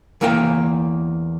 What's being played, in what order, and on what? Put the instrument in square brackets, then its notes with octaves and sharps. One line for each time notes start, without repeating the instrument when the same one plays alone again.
[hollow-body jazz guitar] E2 E3 A#3 A#4 C5 G5